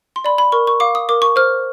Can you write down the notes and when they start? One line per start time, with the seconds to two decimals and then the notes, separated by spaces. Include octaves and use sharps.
0.16 C6
0.24 D5 B5
0.38 B5
0.52 A#4 C#6
0.67 C#6
0.80 F5 D6
0.95 D#6
1.09 A#4 D6
1.22 C#6
1.36 C5 F6